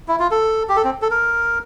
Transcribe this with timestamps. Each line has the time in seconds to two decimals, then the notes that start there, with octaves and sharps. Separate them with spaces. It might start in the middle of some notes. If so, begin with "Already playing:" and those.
0.08 E4
0.19 F4
0.31 A4
0.69 G4
0.76 A4
0.84 C4
1.02 A4
1.11 A#4